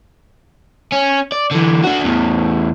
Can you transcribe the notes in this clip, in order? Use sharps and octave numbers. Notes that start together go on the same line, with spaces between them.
C#4
D5
D3 E3
D4 F#4
E2 A2